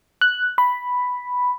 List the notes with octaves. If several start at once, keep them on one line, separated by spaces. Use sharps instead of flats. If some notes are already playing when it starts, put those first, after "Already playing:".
F#6
B5